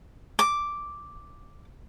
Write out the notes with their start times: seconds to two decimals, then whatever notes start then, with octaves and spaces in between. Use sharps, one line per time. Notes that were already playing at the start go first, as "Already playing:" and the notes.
0.39 D6